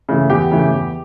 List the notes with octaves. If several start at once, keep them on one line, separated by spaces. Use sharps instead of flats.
C#3 E3 A3
E2 G4
C#3 E3 A3
E2